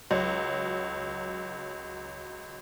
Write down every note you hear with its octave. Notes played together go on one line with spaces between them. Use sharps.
C#2 F#3